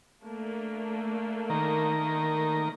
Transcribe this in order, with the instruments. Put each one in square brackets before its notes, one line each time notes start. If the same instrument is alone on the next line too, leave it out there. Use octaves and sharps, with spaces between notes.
[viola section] A3 A#3 D4
[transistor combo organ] D#3 A#4